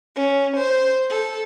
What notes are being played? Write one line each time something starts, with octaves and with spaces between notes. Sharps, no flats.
C#4
C5
A4